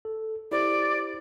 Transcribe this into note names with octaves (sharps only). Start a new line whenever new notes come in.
A4
E4 G4 C5 D5